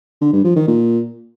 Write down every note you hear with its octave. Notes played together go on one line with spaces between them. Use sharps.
D3
G2
F3
D#3
A#2